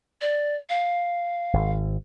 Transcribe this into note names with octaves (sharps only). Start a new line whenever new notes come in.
D5
F5
G#1